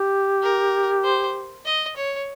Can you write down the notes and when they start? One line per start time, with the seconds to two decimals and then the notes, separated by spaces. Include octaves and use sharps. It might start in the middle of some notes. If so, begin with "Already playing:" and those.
Already playing: G4
0.42 A#4
1.04 C5
1.65 D#5
1.96 C#5